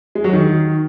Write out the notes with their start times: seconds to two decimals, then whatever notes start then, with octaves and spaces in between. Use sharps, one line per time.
0.15 G#3
0.24 F#3
0.33 D#3